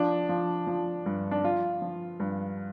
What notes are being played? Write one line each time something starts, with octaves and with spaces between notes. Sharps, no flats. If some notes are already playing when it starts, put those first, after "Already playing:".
Already playing: F3 D4
F3
F3
G2
D4
F3 F4
F3
G2